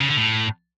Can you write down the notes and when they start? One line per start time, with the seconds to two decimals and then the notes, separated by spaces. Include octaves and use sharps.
0.01 C#3
0.09 D3
0.17 A2